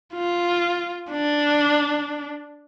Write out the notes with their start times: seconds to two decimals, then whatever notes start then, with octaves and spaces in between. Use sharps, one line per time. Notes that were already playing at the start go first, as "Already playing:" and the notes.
0.14 F4
1.11 D4